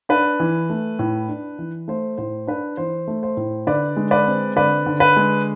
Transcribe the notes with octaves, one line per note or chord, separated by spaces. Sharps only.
D4 B4
E3
A3
A2
D4
E3
A3 C5
A2 C5
D4 B4
E3 C5
A3
C5
A2
D3 B4 D5
G#3
B4 D5
C4
D3 B4 D5
D3
B4
G#3